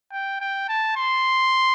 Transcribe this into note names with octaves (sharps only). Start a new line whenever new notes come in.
G5
G5
A5
C6